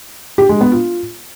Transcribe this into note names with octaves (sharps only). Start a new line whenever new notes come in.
G4
G#3
B3
F4